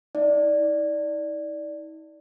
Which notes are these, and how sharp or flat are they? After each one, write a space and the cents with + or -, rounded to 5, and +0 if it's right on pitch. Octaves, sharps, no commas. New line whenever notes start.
D#4 +45 D5 +0